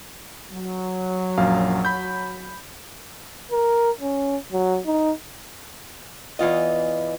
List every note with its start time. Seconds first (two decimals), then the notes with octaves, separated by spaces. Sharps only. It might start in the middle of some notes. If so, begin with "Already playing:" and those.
0.51 F#3
1.37 A#1 F#2 F5
1.85 B5 G6
3.52 A#4
4.01 C#4
4.52 F#3
4.86 D#4
6.39 E2 E3 F4 D#5